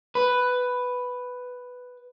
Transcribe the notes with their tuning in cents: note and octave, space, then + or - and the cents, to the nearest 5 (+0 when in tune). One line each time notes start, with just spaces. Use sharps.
B4 +5